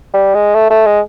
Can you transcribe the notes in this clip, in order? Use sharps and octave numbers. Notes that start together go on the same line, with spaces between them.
G3
G#3
A3
A3
G#3